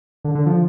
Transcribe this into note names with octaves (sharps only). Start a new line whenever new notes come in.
D3
D3
F3